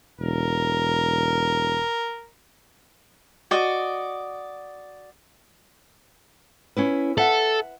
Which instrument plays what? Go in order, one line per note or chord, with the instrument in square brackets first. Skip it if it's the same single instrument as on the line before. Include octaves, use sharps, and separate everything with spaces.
[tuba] E1 [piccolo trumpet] A#4
[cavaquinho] F#4 D5 D#5
[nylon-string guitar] C#4 E4 B4
[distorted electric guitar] A4 [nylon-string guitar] E5 F#5